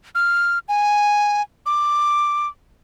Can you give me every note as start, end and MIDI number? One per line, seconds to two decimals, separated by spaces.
0.15 0.59 89
0.69 1.42 80
1.66 2.48 86